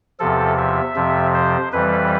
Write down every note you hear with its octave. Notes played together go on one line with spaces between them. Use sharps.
E2 C3 F3 A4
E5
F2 C3 F3
C5
F2 E3 G3 B4